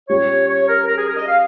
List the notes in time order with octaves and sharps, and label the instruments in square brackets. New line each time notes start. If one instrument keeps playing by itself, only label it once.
[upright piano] A#2 G3 C#4 G4 [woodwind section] C#5
[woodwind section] C#5
A#4
A#4
G#4
A#4
D#5
F5